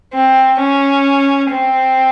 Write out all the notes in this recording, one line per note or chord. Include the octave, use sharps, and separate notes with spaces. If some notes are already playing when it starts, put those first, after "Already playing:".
C4
C#4
C4